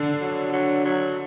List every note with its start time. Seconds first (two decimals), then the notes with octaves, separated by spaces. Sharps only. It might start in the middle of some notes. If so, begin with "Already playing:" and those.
Already playing: D3 D4
0.21 F#3
0.53 F#3
0.85 F#3